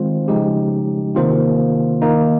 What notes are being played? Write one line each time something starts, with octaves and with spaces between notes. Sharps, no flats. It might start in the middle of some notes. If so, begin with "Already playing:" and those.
Already playing: D#3 G#3 C4 F4 C5
C#3 F3 G#3 D#4 G4
C3 D#3 A#3 F4 C5
D#3 A#3 D#4